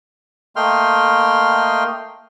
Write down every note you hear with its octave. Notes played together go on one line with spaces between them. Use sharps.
A3 A#3 D#5 G5 C6 F6